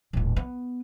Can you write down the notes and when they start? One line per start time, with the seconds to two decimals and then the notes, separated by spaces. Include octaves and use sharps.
0.13 D#1 A1
0.36 B3